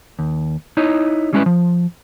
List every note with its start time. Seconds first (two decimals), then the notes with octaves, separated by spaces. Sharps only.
0.19 D#2
0.77 D#4 E4 C#5 D#5
1.33 G3 G#3 C#4 E4 A#4 B4
1.46 F3